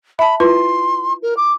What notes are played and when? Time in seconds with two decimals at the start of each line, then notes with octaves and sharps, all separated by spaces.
0.19 E5 A5 B5
0.40 E4 F4 B4 C6
1.22 A#4
1.37 D6